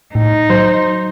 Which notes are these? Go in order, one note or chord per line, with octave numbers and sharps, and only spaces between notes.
A2 D#4
F#3 C5